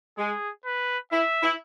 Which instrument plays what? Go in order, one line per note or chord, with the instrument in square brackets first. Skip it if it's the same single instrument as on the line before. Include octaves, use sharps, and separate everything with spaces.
[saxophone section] G#3 [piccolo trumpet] G#4
[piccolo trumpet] B4
[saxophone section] E4 [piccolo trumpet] E5
[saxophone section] E4